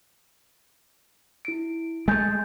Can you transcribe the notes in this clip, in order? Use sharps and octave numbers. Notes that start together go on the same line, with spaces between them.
E4 D7
G#3 A3 G#5 G6 A6